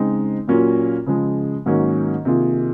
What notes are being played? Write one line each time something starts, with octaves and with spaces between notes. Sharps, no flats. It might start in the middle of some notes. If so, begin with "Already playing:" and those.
Already playing: C#3 G#3 C4 D#4
A#2 F#3 A#3 C#4 F4
C#3 F3 G#3
G#2 D#3 F#3 A#3 C#4
C3 D#3 A#3 F4 G#4